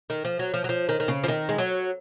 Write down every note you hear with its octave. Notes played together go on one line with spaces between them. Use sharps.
D#3
F3
F#3
F3
F#3
F3
D#3
D#3
C#3
F3
D#3
G#3
F#3